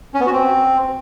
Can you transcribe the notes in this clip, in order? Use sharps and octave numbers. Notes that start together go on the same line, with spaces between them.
C#4
B3
F#4
C4